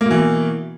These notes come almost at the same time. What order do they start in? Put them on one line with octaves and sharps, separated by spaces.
A#3 B2 E3